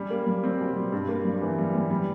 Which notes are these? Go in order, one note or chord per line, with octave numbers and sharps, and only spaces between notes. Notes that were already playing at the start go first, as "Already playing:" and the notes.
Already playing: G3 C#4
A#3
G3
G3 C4
B2
G3
G2
A#3
G3
E3
G3
G3
G3